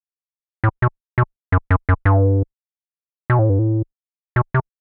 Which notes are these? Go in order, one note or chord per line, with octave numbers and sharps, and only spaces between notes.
A2
B2
B2
F#2
F#2
F#2
G2
B2
A2
G2
A2
B2
C3